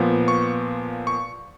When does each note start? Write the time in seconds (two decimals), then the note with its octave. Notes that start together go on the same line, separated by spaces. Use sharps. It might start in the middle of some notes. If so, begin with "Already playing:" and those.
Already playing: A#2 F3 B3
0.28 C#6
1.07 C#6